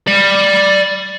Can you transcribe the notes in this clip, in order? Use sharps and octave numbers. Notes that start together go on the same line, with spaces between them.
D5 B5